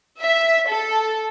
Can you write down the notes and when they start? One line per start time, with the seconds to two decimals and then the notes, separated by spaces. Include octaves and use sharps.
0.22 E5
0.69 A4